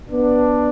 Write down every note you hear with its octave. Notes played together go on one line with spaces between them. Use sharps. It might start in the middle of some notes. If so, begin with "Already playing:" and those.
B3 D4